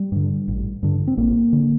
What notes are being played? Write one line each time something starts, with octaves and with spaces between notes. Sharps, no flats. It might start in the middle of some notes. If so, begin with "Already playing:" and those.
Already playing: G3
G2 D3
A1
G2 D3
C4
A1 A#3
D3